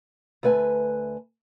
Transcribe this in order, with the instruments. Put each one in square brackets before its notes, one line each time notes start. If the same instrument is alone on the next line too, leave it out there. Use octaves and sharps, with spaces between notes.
[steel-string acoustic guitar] D2 A3 B4 G5 G#5